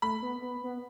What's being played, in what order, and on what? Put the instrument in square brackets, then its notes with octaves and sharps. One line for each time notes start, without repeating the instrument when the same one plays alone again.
[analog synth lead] A3 [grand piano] B5
[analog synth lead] B3
B3
B3